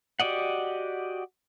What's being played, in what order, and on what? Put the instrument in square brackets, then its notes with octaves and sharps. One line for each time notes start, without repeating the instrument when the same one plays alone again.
[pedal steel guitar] F#4 G4 D5 D#5 F#5